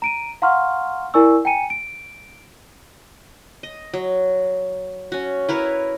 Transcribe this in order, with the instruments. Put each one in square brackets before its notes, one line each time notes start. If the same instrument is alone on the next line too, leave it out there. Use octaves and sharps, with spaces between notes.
[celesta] A#5 D7 D#7
F5 F#5 A#5 C6 C#6 F6
E4 A#4 D5 G#5 C#6 E6
G5 G#5 A#5 C#7 D#7
D7
[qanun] D#5
F#3
C#4 F#4
E4 A#4 B4 C#5